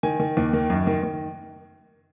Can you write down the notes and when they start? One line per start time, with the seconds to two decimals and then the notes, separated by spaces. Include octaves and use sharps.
0.03 D#3 G#5
0.20 D#3
0.37 D#2
0.53 D#3
0.70 F#2
0.87 D#3
1.03 D#3